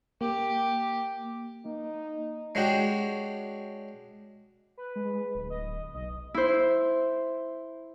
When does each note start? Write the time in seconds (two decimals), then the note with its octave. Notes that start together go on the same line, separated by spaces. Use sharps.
0.21 A#3 G4
1.65 A#3 D#4
2.55 G#3 C#4 D4 F#4 G4
4.77 B4
4.96 G#3
5.35 D1
5.50 D#5
5.94 B1 D#5
6.34 E4 C5